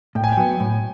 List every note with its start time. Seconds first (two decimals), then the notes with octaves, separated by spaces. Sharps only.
0.15 A2 G5
0.24 G#5
0.32 G5
0.37 F#3 B3
0.60 A2